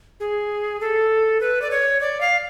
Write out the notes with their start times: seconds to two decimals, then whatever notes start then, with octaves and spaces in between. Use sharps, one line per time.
0.20 G#4
0.81 A4
1.41 B4
1.62 D5
1.71 C#5
2.01 D5
2.21 F5